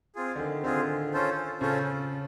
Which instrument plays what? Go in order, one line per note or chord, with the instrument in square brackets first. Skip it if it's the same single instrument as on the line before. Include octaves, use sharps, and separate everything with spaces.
[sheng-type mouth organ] C4 F4 G#4
[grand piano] D3
D#3
[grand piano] D3 [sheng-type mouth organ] C4 F4 G#4
[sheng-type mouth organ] C#4 F4 A4 C5
[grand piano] C#3 [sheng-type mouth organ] C#4 F4 A4 C5